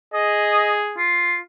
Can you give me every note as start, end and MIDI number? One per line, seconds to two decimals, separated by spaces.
0.14 1.03 68
0.14 0.78 75
0.98 1.37 65